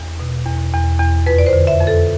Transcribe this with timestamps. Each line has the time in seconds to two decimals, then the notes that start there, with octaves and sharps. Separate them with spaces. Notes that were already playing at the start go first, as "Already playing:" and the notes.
Already playing: E2
0.19 B2
0.46 E2
0.74 E2
0.99 E2
1.26 F2 B4
1.38 D5
1.46 C5
1.53 D3
1.67 E5
1.80 F2
1.87 A4